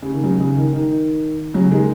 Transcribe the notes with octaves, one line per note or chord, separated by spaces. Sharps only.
C#3
D#3
C#3 F#3
C#3
D#3
D#3
C#3 F#3
D#3 G#3